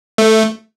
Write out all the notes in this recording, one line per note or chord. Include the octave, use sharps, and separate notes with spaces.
A3